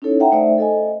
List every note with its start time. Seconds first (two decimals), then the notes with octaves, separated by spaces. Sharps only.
0.02 C#4 D#4 E4 A4 C#5
0.20 E5 F#5 G5 A#5
0.32 A3 D#4 C5 D5 E5
0.58 A4 D#5 G#5